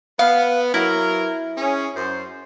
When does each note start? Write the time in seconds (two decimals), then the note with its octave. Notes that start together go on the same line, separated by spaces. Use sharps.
0.19 B3 F5
0.74 F#3 E4 A#4
1.57 C#4 G#4
1.95 F#2 C5